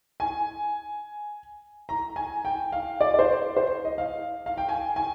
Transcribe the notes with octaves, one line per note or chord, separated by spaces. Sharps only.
G#5
A#5
G#5
G5
F5
D5
D5
C5
C5
D#5
F5
F5
G5
G#5
G#5